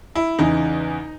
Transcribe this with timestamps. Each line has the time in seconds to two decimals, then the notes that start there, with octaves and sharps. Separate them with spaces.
0.15 E4
0.39 E2 C#3 E3 D#4